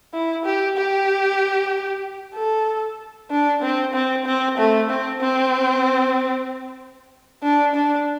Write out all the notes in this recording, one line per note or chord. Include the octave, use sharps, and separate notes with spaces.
E4
G4
G4
A4
D4
C4
C4
C4
A3
C4
C4
D4
D4